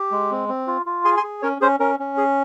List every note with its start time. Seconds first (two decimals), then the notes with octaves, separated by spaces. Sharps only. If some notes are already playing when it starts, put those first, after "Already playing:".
Already playing: G4
0.11 G#3
0.31 C4
0.49 C4
0.67 F4
0.86 F4
1.05 G#4 G#5 C6
1.17 G#5 C6
1.23 G#4
1.42 C#4 A#4 C#5
1.61 C#4 G#4 C5
1.80 C#4 A#4
2.00 C#4
2.17 G#4